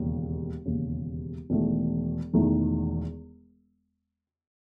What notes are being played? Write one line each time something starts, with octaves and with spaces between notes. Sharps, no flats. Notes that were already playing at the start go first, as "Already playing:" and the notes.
Already playing: E1 D#2 C#3
E1 D#2 C#3
E1 E2 D#3 A3
E1 E2 D#3 A3